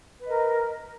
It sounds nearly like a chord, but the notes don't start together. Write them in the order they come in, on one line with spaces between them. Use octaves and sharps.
B4 D#5 A#4